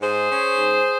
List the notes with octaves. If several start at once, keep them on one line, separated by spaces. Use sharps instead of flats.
G#2 G#4 C5
C#4
G#2